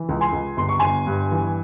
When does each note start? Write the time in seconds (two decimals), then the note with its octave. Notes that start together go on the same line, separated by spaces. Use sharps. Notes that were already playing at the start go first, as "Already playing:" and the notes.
Already playing: E3
0.09 C#2
0.21 G#5 C6
0.33 C#2
0.57 G1 C6
0.69 C#6
0.79 G1 G#5 C6
1.07 G2
1.32 E3